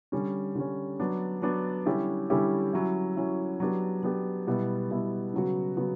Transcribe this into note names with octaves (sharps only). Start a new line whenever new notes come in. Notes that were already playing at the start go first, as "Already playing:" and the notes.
D3 G3 C#4
D3 G3 C#4
F#3 B3 D4
F#3 B3 D4
D3 G3 C#4 E4 G4
D3 G3 C#4 E4 G4
F#3 C#4 E4
F#3 C#4 E4
F#3 B3 D4 G4
F#3 B3 D4 G4
B2 G3 B3 E4
B2 G3 B3 E4
C#3 F#3 B3 F#4
C#3 F#3 B3 F#4